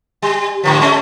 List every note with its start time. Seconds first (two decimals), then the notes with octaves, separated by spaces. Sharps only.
0.22 G3
0.63 G#2 D3 F3
0.81 G#3 A3 C#4